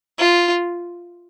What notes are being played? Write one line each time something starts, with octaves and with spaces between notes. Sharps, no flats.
F4